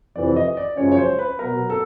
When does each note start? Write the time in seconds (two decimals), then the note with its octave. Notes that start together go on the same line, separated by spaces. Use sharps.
0.15 F2 C3 E3 D5
0.36 D#5
0.57 D5
0.77 F#2 C#3 F3 G#3 C#4 C#5
0.92 C#5
0.98 C5
1.19 B4
1.39 B2 F#3 B3 A#4
1.70 A4